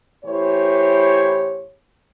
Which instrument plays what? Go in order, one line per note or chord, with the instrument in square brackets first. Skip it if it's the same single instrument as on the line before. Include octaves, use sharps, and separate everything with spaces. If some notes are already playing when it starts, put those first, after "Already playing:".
[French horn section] A2 E3 G4 C5 C#5